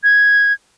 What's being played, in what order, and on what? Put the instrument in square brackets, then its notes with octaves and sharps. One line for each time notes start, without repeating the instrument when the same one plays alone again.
[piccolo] G#6